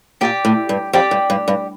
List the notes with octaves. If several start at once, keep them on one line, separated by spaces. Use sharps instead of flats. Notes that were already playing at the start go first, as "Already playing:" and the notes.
A#2 G4 D5 G5
A2
G2
F2 G4 D5 G5
G2
G2
G2